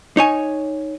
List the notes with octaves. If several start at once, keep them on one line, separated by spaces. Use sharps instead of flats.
D#4 C#5 G#5